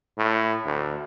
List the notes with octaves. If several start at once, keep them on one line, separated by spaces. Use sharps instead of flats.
A2
D2